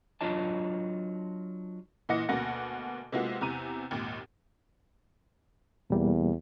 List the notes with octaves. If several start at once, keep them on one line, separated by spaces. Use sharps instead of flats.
F#3 D4 F4 D#5 A5
A#2 E3 D#5 F#5 A#6 C#7
D2 B2 A#3 F#4 F#5 A#6
C3 G#3 A#3 B3 F4 F#4
E2 C3 A#5 D#7
G#1 D#2 A#2
E2 B2 G3 A#3